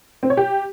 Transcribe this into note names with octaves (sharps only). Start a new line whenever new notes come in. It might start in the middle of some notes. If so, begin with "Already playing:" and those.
C4
C#5
G4